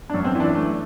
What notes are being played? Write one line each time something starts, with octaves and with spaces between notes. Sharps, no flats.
D4
F#2
C4
E3
D4
A3